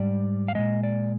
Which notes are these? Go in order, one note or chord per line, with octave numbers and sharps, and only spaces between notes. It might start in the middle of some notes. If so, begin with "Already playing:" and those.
Already playing: G#2 G3 D5
F5
A#2 F3 G#3 D#5
D5